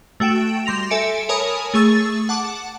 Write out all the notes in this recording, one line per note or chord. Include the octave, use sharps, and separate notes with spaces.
A3 F#4 G5 D7 E7
G3 C6 A#6 F7
A4 E5 G#5 C#7 D7
A#4 C#5 G#5 A5 B5 D#6
A3 G#4 C#6 E6 A6
F#5 A5 D6